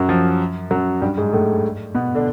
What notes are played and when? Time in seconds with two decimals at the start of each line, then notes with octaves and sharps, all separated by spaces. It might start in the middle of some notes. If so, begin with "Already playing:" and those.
Already playing: F#2 F#3
0.09 F3
0.71 F#2 F#3
1.01 G2 G3
1.17 G#2 G#3
1.33 A2 A3
1.95 B2 B3
2.15 D3 D4